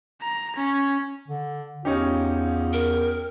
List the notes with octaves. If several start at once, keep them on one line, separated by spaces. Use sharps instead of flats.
A#5
C#4
D3
E2 C#4 D#4 F4 G4
A#4